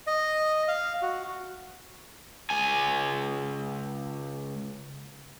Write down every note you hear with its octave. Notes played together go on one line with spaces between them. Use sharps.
D#5
F5
F#4
C#2 G#5